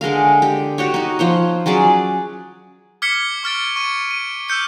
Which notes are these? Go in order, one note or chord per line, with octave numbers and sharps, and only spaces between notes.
D3 G#3 A#4 F5
G4
F#4 G4 C#5
D#4 F#4
F3 C5 C#5
F#3 C#4 G#4 D5
D6 F6 G#6 B6 C#7 G7
C#6 F6 A6 D7
C#6 D#7
D#7
D6 E6 F6 G6 C#7